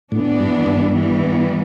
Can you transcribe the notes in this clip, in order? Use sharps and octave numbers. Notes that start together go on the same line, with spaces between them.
A2 E3 B3 D4
G2
G2
E3 G3 B3